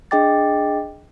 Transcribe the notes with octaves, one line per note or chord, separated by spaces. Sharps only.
D4 G#4 D#5 G5 D6 A6